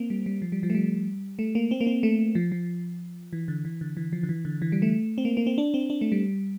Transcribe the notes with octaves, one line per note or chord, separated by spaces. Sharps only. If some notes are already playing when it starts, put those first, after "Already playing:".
Already playing: A#3 C4
G3
G3
F3
G3
F3
A3
G3
A3
A#3
C4
A#3
C4
A3
F3
F3
E3
D3
E3
D3
E3
F3
D3
E3
D3
E3
G3
A3
C4
A#3
A#3
C4
D4
C4
D4
A3
G3